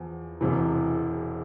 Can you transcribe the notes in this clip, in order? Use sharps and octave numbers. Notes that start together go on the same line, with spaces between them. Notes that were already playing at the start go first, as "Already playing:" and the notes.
Already playing: E2 F3
E1 E2 C3 E3